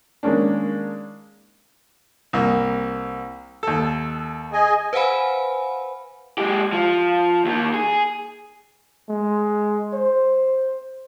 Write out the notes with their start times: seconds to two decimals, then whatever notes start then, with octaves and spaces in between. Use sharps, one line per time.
0.23 D#3 G#3 A#3 C#4 D4
2.33 C2 A#3
3.63 D#2 A4
4.53 G#4 D#5 G#5
4.93 B4 C5 F5 F#5 G#5 B5
6.38 G#3 G4
6.73 F3
7.45 D#2 D#3
7.74 G#4
9.09 G#3
9.94 C5